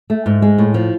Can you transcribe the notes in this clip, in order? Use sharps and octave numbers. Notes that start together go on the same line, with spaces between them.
A3
G#2
G#3
A2
F3